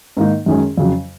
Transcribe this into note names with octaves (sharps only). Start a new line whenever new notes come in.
G#2 D#3 A#3 D#4
F#2 D#3 G#3 C#4 G#4
F2 C#3 F#3